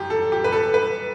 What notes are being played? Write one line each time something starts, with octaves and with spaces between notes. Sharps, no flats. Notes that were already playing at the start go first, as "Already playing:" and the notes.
Already playing: F#2 E3 G4
A4
G4
B4
A4
B4